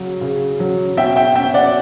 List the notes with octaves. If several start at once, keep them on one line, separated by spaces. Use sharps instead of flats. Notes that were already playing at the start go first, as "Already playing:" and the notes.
Already playing: C#3 F#3
C#3
F#3
B2 E5 G5
E5 G5
C#4 E5 G5
D5 F#5